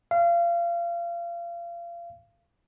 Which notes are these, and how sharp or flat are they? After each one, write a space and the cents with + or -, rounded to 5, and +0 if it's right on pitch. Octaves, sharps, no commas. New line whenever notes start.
F5 -30